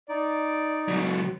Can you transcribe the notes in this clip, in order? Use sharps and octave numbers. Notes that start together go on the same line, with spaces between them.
D#4 D5
C#2 F#3